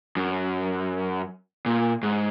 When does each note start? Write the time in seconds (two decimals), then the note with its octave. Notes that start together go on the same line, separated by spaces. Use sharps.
0.16 F#2
1.66 A#2
2.03 G#2